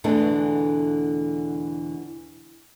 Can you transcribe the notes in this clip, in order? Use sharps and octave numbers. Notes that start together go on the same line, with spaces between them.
E2 B2 D3 E3 A3 D4